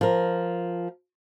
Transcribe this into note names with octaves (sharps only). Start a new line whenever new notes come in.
F3 A#4